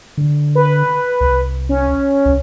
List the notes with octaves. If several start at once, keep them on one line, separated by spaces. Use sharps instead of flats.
D3
B4
C2
C#4
C2